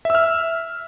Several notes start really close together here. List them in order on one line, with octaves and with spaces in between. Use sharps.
E5 E6 F6